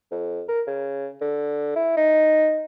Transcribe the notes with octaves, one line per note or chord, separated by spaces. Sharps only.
F2
A#4
C#3
D3
E4
D#4